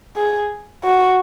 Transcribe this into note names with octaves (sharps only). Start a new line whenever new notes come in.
G#4
F#4